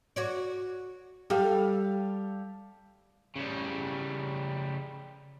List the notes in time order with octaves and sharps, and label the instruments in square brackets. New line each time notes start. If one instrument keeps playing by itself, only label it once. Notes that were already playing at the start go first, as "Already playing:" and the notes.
[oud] F#4 C#5 D5
[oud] G3 [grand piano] G4 [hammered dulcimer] A4 F5
[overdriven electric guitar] C#3 G3